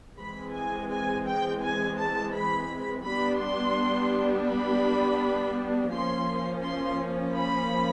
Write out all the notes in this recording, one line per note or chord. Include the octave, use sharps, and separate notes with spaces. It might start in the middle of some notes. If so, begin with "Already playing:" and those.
E3 G#3 C4 B5
G#5
G#5
G5
G#5
A5
B5
G3 B3 D4 B5
C6
B5
F3 A#3 C#4 C6
C6
B5